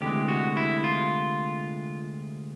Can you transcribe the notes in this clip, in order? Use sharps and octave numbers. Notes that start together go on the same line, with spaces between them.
D2 C3 E3 G#3 G4
F#4
E4
F4